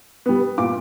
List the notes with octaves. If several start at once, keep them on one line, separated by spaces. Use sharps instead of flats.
G3 B3
A#2 D6